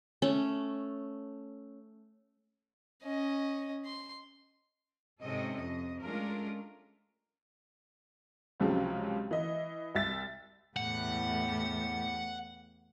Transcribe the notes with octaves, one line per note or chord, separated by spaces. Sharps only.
A3 C#4
C#4 D#5
C6
G#2 C3 C#4 A4 D#5
F2 D#5
G#3 A3 C#4 D4 F4 A#4
C#2 C3 F3 F#3 G#3 C#4
E3 D#5
C2 E5 A6
E2 A2 G4 F#5